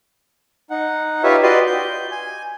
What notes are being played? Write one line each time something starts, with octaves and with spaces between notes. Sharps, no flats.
D#4 F#5
D#4 F4 G4 B4 C#5 E5
F#4 G4 B4 D5 D#5 C6
G6
G#5